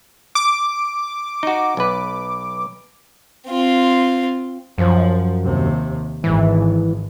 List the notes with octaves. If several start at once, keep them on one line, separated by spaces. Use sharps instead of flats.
D6
D#4 F#4
B1 B4
C4 F4
F#2 F3
D#2 C3
G#1 E3